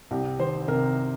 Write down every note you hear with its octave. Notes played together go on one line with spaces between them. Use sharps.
C2 G4
D#3 C5
C3 A#4